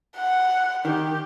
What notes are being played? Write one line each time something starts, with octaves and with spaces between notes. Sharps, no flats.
F#5
D#3 G4